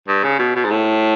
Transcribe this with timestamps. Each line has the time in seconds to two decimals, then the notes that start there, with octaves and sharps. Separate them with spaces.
0.08 G2
0.23 C#3
0.39 B2
0.55 B2
0.65 G#2
0.70 A2